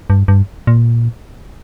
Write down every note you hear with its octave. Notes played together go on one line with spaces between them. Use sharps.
G2
G2
A#2